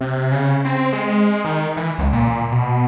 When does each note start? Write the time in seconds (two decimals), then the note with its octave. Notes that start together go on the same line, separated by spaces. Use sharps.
0.01 C3
0.32 C#3
0.65 C4
0.93 G#3
1.45 D#3
1.77 E3
1.98 C#2
2.13 A#2
2.52 B2